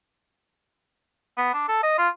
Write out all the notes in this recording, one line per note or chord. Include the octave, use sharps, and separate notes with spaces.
B3
D4
A4
D#5
F4